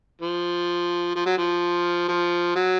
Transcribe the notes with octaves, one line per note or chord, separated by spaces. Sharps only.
F3
F3
F#3
F3
F3
F#3